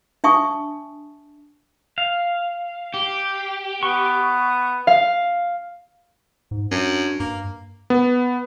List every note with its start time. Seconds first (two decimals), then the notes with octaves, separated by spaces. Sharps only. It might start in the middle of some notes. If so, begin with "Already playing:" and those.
0.24 D4 E5 G#5 A5 C#6 D#6
1.98 F5
2.94 G4
3.83 B3 C#6
4.87 F5
6.51 G#2
6.72 F#2 D4
7.20 G2 A#3
7.90 B3